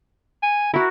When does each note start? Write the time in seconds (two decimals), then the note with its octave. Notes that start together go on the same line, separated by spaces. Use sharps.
0.43 G#5
0.74 E4 F#4 A#4